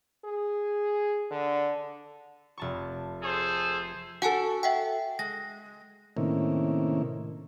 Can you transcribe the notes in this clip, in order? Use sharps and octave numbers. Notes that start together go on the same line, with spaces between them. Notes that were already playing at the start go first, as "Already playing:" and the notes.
G#4
D3
F1 A5 C#6
G#4 A4 C5
F#4 A4 F#5 G#5 A5
E5 F#5 G5
G#3 A#6
A2 C3 D#3 A#3 C#4 E4